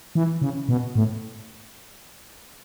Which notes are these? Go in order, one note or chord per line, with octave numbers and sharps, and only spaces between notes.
E3
C#3
B2
A2